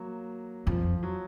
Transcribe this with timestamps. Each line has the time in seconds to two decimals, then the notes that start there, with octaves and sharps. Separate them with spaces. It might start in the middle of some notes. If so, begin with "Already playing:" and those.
Already playing: F#3 A#3
0.66 F2 F3
1.03 F#3